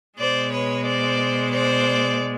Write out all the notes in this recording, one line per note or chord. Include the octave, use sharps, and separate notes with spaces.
B2 G#3 C5 D5
B4 C#5
C5 D5
C5 D5